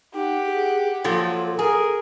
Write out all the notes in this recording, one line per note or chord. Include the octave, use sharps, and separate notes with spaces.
D#4 G4 F#5
G#4
A#2 F3 F#3 A4
G#4 A#4